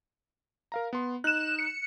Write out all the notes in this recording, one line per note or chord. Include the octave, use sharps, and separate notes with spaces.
A#4 F5 A#5
B3 C6
D#4 F#6 E7
C#7